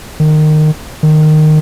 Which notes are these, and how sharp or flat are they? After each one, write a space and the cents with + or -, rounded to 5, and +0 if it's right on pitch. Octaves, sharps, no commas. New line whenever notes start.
D#3 -20
D#3 -15